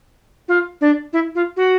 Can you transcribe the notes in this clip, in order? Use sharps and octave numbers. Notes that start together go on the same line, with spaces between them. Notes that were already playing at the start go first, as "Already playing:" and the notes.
F4
D4
E4
F4
F#4